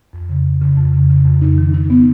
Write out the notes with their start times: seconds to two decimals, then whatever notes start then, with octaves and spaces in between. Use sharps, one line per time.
0.13 F2
0.29 C#3
0.46 C#3
0.62 C#3
0.77 F2
0.93 C#3
1.10 C#3
1.25 F2
1.42 D#4
1.58 D#3
1.74 D#4
1.90 B3